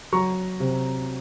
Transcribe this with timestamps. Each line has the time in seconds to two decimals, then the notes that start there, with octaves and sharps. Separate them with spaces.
0.13 F#3 A#5 C#6
0.60 C3